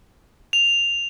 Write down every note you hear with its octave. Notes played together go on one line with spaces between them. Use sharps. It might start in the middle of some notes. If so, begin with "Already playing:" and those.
F7